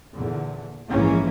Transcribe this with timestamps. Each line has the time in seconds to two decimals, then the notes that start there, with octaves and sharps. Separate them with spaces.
0.14 E2 A#2 D3
0.87 A#1 G#2 E3 A#3 C#4